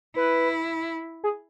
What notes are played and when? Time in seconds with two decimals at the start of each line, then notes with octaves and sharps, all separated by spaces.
0.16 E4 B4
1.24 G#4